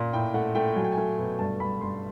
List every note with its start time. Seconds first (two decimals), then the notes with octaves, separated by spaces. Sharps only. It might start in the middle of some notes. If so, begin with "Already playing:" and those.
Already playing: A#2
0.13 A2 G5
0.34 A3 F#5
0.55 A3 G5
0.76 F#3 G#5
0.84 G5
0.92 G#5
0.97 A3
1.19 B2
1.39 G2 A5
1.60 G2 B5
1.81 G2 C6